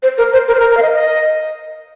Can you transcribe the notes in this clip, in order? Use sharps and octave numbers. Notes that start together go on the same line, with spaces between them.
C5
A#4
C5
A#4
C5
A#4
A#4
F5
D#5
D#5